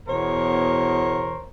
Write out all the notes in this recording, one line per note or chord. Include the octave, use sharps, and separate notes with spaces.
E2 B2 A#4 C5 C#5